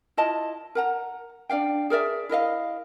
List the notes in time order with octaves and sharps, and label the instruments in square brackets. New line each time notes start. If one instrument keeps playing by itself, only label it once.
[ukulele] E4 F4 D#5 A5
A#4 F#5 A#5
D4 D5 F5 G5
G#4 A#4 D5 E5
E4 A#4 D#5 F5